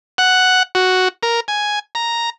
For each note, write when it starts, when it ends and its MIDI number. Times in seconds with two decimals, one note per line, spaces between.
0.18 0.63 78
0.75 1.08 66
1.23 1.40 70
1.48 1.79 80
1.95 2.30 82